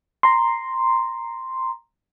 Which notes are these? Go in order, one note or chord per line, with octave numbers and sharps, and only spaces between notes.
A#5 C6